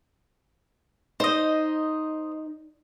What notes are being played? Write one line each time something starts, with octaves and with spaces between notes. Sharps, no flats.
D#4 C5 D#5